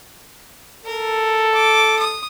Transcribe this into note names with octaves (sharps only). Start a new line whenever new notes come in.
A4 A#4
D6
D#6